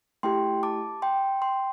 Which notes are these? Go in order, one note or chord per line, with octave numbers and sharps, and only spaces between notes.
A3 E4 G4 G5 C6
A5 D6
G5 C6
G5 C6